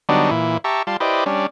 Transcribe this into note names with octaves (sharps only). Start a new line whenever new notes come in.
D3 F#3 G3 B3 D4 D#4
A#2 E3 E4
G4 E5 A5 A#5 C#6
G3 F4 A5 C6
E4 G4 B4 C5 D5 D#5
G3 C#4 D4